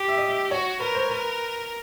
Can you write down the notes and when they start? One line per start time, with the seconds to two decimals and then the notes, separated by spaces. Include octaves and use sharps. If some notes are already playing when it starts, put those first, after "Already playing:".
Already playing: G4
0.08 E5
0.18 D#5
0.28 E5
0.51 F#4 C#5
0.80 A#4 B4
0.95 C5
1.09 B4